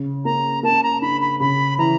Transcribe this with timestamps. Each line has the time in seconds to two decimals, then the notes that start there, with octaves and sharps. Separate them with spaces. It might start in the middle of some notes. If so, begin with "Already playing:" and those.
Already playing: C#3
0.25 A#3 A#5
0.63 A#3 A5
0.83 A#5
1.01 D4 B5
1.21 B5
1.40 C#3 B5
1.78 E3 A#5